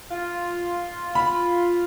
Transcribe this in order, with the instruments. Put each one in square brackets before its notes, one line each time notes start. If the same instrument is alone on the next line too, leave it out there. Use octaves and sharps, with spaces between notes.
[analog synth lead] F4
[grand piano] B5